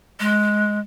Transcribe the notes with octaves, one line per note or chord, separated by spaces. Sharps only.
G#3